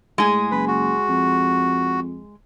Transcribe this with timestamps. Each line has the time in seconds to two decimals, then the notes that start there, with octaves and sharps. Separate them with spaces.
0.18 A2 G#3 G#4
0.51 F#1 B4
0.68 F#4
1.09 F2